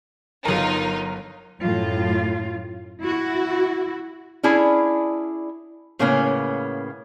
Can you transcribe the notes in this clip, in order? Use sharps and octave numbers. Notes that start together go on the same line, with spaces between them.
G1 F#3 D#4 F4 A#4 C#5 A5
F#2 A2 F4
E4 F#4
C#4 D4 E4 G#4 D5
A2 C#3 A#3 B3 C#4